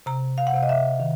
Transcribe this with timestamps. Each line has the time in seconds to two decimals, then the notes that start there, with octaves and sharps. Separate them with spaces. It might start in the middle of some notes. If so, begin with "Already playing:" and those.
0.06 C3 A#5
0.38 F5
0.47 F#5
0.53 C3 F5
0.63 D#5
0.69 E5
1.00 D#3